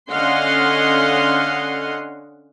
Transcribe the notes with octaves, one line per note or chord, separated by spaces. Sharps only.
D3 C#4 D#5 F5 F#5 C6